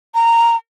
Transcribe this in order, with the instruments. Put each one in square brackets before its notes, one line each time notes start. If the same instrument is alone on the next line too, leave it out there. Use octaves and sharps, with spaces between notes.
[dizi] A#5